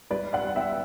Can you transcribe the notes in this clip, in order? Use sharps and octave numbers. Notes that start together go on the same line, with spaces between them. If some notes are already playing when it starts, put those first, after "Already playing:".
G3 B4 D5
D5 F#5
G3
E5 G5